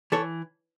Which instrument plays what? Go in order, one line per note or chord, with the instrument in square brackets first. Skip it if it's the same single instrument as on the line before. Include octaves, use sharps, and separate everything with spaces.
[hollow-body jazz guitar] E3 A4 C#5